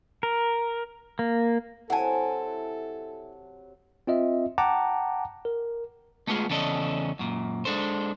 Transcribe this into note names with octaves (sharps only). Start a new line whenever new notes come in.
A#4
A#3
C3 F#3 E4 A4 F#5 G#5 A5
C4 F4 D#5 E5
F#5 G5 A5 A#5 D6
A#4
G#3 A3 B3 D#4 F4 G#4
E2 C#3 C#4 A4 D5 D#5
F#2 A#2
G#3 D4 A4 C5